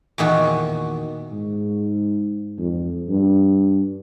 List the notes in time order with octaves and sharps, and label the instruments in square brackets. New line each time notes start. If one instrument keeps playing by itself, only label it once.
[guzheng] E2 A#2 D#3 F#4
[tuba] G#2
F2
G2